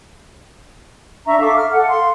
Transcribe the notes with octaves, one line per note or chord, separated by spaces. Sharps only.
D4 E5 A#5 C#6
A4 E5 F5 D6
F6
A4 F#5
F5 C6